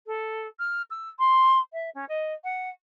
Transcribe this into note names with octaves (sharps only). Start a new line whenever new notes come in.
A4
F6
E6
C6
E5
C#4
D#5
F#5